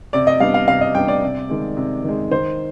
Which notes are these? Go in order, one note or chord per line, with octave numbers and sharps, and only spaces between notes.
C3 D5
D#5
G3 B3 D4 F5
F5
C3 F5
D#5
G3 B3 D4 G5
D5
C3
D#3 G#3
C3
D#3 G#3
D#3 C5